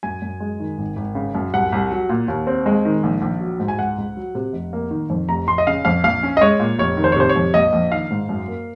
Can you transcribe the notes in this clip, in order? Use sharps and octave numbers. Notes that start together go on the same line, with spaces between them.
F#2 G#5
F#2
G#3
D#3
G#1
G#1
C#3
F#2
C2 F#5
C2
F#3
A#2
D#2
C4
G#3
D#3
A#1
A#1
F#3
G#2
G#5
C#2 F#5
C#2
F#3
C3
F1
A#3
D#3
F2
F1 A#5
F1 C6
D#5
C#3 F5
F2 F5
A#1 F5
C#4
D#5
G#3 C#5
A#2
F1 C#5
D#3
C5
C#5
C3 C5
C#5
F2
A#1 D#5
A#1
D#3 F5
G#2
F#2
A#3